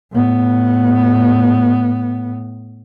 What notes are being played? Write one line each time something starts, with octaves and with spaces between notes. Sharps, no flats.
A2 B3